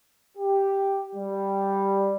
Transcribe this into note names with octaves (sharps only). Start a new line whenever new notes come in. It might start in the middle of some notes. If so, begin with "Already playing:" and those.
G4
G3